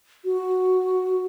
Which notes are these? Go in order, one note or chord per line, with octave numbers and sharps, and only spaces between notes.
F#4